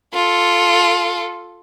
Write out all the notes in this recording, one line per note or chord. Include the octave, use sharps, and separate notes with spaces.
F4 A4